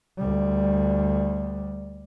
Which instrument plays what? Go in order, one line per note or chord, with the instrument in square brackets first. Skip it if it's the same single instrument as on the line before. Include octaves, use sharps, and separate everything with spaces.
[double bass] D2 G3